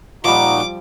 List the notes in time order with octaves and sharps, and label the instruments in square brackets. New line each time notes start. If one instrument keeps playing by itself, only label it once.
[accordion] A#2 D#4 F#4 [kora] F3 G3 [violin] D6